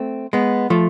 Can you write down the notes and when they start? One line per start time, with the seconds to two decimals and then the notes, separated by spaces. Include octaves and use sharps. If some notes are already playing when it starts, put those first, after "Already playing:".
Already playing: A3 C4
0.33 G#3 B3
0.70 F3 A3